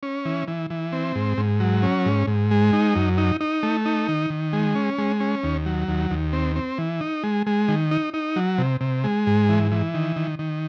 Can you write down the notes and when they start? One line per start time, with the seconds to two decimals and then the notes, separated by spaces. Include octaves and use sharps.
0.03 C#4
0.25 E3
0.47 E3
0.70 E3
0.92 C4
1.15 G#2
1.38 G#2
1.60 F#3
1.83 C#4
2.06 G#2
2.27 G#2
2.51 G#3
2.73 D#4
2.95 F#2
3.18 D#4
3.41 D#4
3.63 A3
3.86 D#4
4.09 D#3
4.30 D#3
4.53 G#3
4.75 C#4
4.98 G#3
5.20 C#4
5.43 D#2
5.66 F#3
5.88 D#2
6.11 D#2
6.33 C4
6.56 C4
6.78 E3
7.01 D#4
7.24 G#3
7.47 G#3
7.68 D#3
7.91 D#4
8.14 D#4
8.36 F#3
8.58 C3
8.81 C3
9.04 G#3
9.27 G#2
9.49 E3
9.72 E3
9.94 D#3
10.16 D#3
10.39 D#3